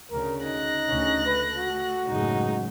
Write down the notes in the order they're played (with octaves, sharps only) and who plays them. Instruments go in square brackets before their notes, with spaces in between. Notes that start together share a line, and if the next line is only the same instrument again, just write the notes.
[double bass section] D2 C#3 [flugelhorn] A#4
[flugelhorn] D#4 [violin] F#6 A#6
[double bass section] D2 C#3 C#4
[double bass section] A3 [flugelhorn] B4
[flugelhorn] F#4
[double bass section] F#1 A2 G#3 [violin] D#4